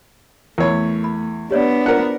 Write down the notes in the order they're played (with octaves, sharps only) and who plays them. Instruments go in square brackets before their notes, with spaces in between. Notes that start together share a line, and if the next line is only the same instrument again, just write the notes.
[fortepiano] E2 C#5 [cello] A3 [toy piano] A#4 B5
[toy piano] B5
[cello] B3 D4 [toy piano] G4 C#5 D5
[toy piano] E4 F4 C5 [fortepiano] A#4 F#5